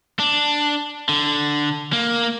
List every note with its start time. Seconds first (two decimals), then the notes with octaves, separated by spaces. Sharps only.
0.19 D4
1.09 D3
1.93 A#3